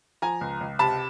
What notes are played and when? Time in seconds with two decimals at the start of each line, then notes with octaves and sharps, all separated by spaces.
0.22 F3 G#5 A#5
0.41 C#2
0.61 C#2
0.79 C3 A5 B5